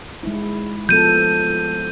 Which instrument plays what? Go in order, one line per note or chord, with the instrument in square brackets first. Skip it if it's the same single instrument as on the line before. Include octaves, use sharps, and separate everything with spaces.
[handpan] G#3 D#4 E4
[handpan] F3 B3 A4 [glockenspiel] G6 D#7